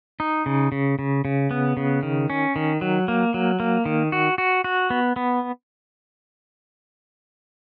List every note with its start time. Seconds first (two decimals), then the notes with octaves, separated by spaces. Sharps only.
0.20 D#4
0.46 C#3
0.72 C#3
0.99 C#3
1.25 C#3
1.51 B3
1.77 C#3
2.03 D#3
2.30 C#4
2.56 D#3
2.81 F#3
3.08 A#3
3.34 F#3
3.60 A#3
3.86 D#3
4.12 F#4
4.38 F#4
4.64 F#4
4.90 B3
5.16 B3